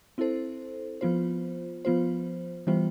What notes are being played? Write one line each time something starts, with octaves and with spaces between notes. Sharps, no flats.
C4 E4 A4 C5
F3 B3 F4 C5
F3 B3 F4 C5
E3 G3 B3 F4 C5